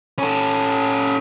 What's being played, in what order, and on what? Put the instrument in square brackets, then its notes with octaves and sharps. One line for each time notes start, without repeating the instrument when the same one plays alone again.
[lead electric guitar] C#4 A4